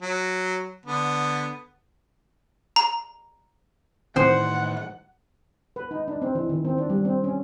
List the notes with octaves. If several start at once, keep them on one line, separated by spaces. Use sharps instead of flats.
F#3
D3 B3
A#5
A2 D#3 E3 C4 C5 F#5
B4
D#4
D4
C4
E3
D#3
C4
D4
G3
C4
C#4